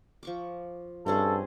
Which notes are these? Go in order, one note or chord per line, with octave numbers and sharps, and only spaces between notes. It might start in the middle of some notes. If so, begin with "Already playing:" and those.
F3 C#6 D6
G2 C4 C#4 G#4 A4